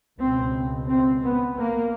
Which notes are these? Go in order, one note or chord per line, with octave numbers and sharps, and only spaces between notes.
C#2 B2 C4
C4
B3
A#3